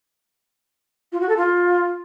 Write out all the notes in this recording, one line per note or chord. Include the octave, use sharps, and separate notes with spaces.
F4
F#4
A4
F4